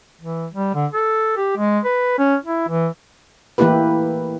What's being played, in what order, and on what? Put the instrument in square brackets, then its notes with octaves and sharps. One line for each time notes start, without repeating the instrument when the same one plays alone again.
[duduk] E3
G3
D3
A4
G4
G#3
B4
C#4
E4
E3
[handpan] E3 A3 A#3 E4 G4 B4